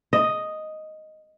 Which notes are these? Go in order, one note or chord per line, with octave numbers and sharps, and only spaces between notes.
D#5